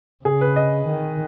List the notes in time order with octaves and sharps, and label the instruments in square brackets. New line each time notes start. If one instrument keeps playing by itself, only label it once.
[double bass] C#3 [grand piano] G#4
[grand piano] B4
D#5
[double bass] D#3